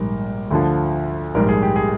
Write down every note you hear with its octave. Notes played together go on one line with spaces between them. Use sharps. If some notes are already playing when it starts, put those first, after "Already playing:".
Already playing: A#1 G#2 G3 A#4
D2 D3 F3
A#1 G#2 G3 A#4
G#4
G4
G#4